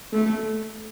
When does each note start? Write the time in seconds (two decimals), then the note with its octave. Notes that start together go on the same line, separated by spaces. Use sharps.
0.13 A3